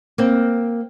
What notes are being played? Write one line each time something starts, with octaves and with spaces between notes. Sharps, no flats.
A#3 C4